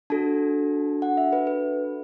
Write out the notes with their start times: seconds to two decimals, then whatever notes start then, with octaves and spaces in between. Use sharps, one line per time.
0.10 D4 F#4 A4 A5
1.02 F#5
1.17 E5
1.33 B4
1.47 B4